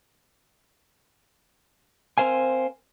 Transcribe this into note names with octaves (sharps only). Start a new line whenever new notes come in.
C4 A#4 C5 F5 G#5